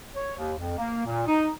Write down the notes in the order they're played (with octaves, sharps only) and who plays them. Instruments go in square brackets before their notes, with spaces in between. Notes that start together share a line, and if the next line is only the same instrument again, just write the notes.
[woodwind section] C#5
D#2
F2
A#3
A#2
D#4